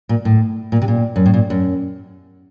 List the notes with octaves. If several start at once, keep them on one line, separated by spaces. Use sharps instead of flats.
A#2
A2
A#2
C3
A#2
F#2
A2
A#2
F#2